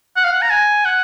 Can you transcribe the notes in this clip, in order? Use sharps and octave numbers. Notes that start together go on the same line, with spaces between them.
F#5
F5
F#5
A#5
G#5
F#5